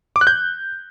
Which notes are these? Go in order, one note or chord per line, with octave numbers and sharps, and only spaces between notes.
D6
F#6
G6